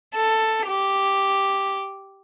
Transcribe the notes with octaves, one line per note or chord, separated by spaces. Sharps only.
A4
G4